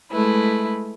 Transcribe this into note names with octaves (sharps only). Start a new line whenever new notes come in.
G#3 A3 E4 B4